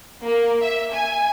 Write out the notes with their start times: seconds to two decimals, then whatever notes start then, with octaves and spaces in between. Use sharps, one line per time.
0.24 A#3
0.62 E5
0.92 G#5